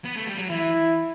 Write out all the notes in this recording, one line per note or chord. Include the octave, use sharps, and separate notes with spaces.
B3
A3
G3
F#3
E3 E4